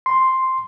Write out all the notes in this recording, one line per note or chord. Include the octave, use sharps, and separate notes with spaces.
C6